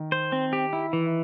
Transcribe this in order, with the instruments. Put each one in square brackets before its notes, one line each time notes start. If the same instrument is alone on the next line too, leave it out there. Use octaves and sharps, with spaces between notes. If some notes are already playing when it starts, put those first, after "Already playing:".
Already playing: [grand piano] D#3
[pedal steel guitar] C5
C4
G4
E4
E3